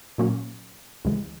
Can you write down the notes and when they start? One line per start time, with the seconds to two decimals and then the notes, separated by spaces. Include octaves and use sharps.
0.18 A#2 F#3 A#3 C#4
1.05 D2 C#3 E3 G#3